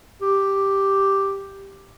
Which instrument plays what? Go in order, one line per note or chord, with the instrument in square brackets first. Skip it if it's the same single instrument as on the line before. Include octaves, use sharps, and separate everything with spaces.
[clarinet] G4